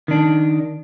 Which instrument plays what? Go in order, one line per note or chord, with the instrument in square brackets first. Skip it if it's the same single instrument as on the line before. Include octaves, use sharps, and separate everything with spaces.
[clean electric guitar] D#3 D4